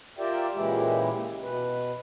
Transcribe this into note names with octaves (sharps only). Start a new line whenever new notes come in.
F4 G4 A#4 D5 E5 G5
A#2 C#3 E3 G#3 E4 G4
B2 B4